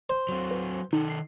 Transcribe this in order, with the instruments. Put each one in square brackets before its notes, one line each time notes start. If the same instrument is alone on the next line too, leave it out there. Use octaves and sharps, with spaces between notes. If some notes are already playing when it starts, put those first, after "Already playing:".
[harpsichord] C5
[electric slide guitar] F#3 C4
[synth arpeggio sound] B4
[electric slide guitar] D#3 A4 [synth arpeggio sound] D#4
[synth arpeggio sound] C7